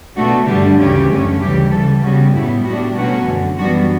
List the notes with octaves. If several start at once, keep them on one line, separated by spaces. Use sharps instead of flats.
B2 A3 D4 F#4
G2 D3 G3 D4 G4
D2 C#3 E3 G3 C#4 G4
F#2 D3 A3 C#4
D2 C#3 E3 G3 G4
C#3 E3 G3 A4
C#3 G3 B3 F#4
A2 G3 B3 E4
A2 G3 B3 D4 F#4
B2 F#3 A3 C#4 F#4
F#2 D3 F#3
F#2 E3 G3 B3 D4 F#4